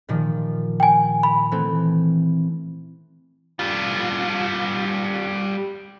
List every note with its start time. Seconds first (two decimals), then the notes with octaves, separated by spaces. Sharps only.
0.09 A#2 D#3 F3
0.80 G5 G#5
1.23 B5
1.52 E3 A3 C4
3.59 G3 F4